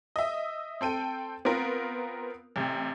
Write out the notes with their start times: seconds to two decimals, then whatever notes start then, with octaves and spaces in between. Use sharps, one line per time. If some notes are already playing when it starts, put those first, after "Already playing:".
0.16 D#5 E5
0.81 C4 A4 G5 D#7
1.45 B3 C4 F4 A#4
2.56 A1 C3